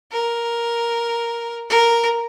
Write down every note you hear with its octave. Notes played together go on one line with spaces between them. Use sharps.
A#4
A#4